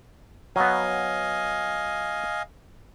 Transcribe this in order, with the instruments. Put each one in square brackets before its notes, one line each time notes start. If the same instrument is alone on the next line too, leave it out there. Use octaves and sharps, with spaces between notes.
[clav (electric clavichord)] F#3 B3 [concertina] D#5 F5 G#5